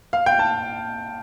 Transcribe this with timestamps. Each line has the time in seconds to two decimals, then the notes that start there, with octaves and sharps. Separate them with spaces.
0.13 F5
0.26 G5
0.39 A5